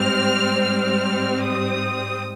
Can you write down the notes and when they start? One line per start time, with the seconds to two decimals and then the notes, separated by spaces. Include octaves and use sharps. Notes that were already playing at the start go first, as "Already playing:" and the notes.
Already playing: G#2 G3 C4 F6
0.63 F6
1.42 D#6